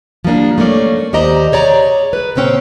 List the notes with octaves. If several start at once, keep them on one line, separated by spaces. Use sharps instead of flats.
F3 G3 A#3 D4
A3 A#3 C#4 D5
D#2 G4 C5 D5 D#5 A#5
G#4 C#5 D5 A#5
B4
A#2 C#3 C4 C#4 G5